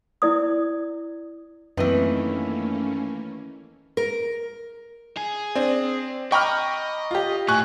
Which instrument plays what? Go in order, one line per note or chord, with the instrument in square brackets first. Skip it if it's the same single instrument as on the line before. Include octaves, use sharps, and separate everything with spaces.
[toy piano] E4 D5 D#6
[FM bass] F#2 [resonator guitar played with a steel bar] D#3 E3 [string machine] A3 A#3 C#4 [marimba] C4 B4
[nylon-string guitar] A#4
[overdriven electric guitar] G#4
[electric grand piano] C4 [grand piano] D4
[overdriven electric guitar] D#5 [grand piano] G5 D6 F6 [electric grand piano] A#5 B5 C#6
[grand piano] F4 G4
[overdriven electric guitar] A2 [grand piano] G#5 F#6 [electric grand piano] C#6